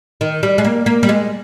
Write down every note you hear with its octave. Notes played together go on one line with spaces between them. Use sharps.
D#3
G3
G#3
A#3
A#3
G3
G#3